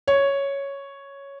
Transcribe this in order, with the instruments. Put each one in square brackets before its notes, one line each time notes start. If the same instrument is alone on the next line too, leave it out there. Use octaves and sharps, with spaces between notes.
[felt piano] C#5